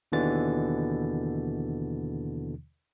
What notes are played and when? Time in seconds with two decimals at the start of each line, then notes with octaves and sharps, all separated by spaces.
0.12 D#2 B2 D3 E3 A6